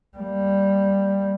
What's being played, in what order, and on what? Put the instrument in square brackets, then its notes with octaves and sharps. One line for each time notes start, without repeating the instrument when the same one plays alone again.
[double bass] G3 A#3